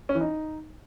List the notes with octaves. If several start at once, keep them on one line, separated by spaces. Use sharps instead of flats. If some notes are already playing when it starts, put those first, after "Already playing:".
C#4
E3
D#4